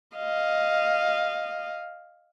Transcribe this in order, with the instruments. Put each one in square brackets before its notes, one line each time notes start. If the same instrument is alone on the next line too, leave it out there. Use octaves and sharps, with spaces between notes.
[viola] D#5 F5